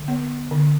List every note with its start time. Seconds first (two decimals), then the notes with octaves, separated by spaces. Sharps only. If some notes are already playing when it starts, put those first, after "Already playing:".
Already playing: D3
0.08 B3
0.51 D3